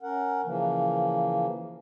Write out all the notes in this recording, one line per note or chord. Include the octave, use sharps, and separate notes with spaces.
C#4 A#4 F#5
C#3 E3 F3 A#3